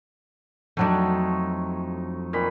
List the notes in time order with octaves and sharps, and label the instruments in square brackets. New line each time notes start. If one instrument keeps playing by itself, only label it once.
[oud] F2 F#3 D4 [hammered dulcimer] A3 D#4
[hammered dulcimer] A#2 D#3 B5